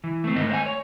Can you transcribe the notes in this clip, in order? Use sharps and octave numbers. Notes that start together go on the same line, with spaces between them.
E3
A3 C4
G#2 D#3 A3 A#4 D#5
C5 F5 G#5
C#5